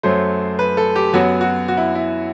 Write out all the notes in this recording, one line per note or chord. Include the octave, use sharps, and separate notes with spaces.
F#2 F#3 A3 C5
B4
A4
G4
F#2 F#3 B3 F#4
F#4
F#4
E4
E4